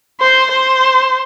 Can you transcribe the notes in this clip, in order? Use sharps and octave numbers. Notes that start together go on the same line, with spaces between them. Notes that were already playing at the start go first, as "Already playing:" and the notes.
C5
C5